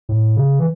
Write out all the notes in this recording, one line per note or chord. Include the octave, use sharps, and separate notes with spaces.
A2
C#3
E3